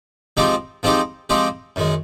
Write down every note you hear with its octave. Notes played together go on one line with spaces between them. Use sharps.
F3 G#3 C4 D#4 G4
F3 G#3 C4 D#4 G4
F3 G#3 C4 D#4 G4
F#2 D#3 G#3